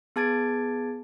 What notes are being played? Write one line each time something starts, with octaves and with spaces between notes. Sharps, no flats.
B3 G#4 A5 G#6 A6 D7